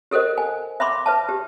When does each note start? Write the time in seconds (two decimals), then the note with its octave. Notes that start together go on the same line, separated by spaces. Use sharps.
0.11 G4 A4 A#4 C5 D#5
0.38 G#5
0.80 E5 B5 C6 D6
1.06 B4 E5 A5
1.29 G4